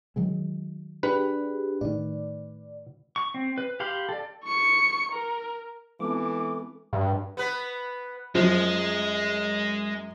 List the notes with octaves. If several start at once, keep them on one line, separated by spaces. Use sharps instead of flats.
D#3 F#3 G#3
D4 G4 G#4 B4
A2 D#3 D5
C#6
C4
B4
G4 F5 B5 C6
A4 D5
C#6 C#7
A#4
E3 G#3 B3 C4 A4 D6
G2
B3 B4
F#2 F3 G#3